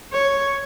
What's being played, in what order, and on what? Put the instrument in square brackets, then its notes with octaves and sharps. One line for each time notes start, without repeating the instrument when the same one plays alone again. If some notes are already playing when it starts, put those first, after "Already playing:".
[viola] C#5